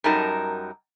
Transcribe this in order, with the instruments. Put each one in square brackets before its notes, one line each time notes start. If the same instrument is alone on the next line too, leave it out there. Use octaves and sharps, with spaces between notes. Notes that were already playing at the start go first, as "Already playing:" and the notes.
[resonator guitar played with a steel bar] F#2 F#3 G3 D#4 A#4 A5